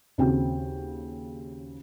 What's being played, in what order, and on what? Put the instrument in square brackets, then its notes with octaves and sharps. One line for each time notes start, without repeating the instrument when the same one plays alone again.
[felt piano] D#2 C#3 C4 F#4 G5